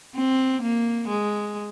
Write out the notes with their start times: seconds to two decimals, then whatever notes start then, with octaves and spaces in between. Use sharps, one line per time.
0.15 C4
0.62 A#3
1.08 G#3